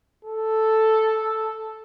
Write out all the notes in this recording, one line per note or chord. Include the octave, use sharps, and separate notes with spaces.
A4